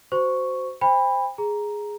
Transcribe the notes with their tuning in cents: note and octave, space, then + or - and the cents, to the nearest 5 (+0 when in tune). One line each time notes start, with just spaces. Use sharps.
F#4 +10 C5 -15 C#6 +0
C5 +0 G5 +40 B5 +0
G#4 +0 A#5 +5